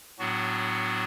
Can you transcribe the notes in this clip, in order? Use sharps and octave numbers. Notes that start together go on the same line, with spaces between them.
A2 F#3 B3 D4 F#4